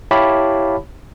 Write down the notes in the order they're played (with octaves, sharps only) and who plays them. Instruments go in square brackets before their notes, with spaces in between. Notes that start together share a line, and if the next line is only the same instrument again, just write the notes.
[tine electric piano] E4 G4 C#5 F5 A5 B5